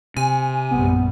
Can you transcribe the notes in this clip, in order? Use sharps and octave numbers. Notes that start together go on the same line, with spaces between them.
C3 G#5
A#1 F#2 G3 B3